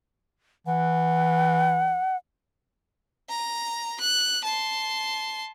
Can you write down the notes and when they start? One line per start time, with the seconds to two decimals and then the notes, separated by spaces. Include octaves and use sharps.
0.67 E3 F#5
3.29 A#5
4.00 F#6
4.44 A5 C6